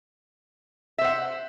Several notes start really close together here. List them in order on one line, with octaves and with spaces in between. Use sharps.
E5 C5 F#5